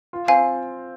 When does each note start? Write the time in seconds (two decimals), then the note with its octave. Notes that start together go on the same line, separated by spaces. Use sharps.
0.13 F4
0.28 C4 F5 G#5